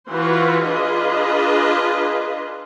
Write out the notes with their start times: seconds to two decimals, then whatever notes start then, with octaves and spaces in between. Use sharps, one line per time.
0.10 E3 F4 F#4 B4 C5
0.67 D4 F4 G#4 B4 D#5